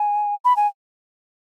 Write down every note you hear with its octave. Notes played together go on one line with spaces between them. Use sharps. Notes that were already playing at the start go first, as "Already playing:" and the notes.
Already playing: G#5
B5
G#5